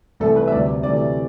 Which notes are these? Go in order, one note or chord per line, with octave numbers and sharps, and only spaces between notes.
C2 C3 E3 A3 A4
B4
E5
D2 C3 G3 D5
D2 C3 E3 A3 D5